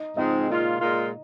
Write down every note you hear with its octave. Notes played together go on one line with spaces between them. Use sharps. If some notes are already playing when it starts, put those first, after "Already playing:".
Already playing: D#4 D#5
G#2 F3 G#3 C4 D#4 D#5
A#2 G#3 F4
A#2 G#3 F4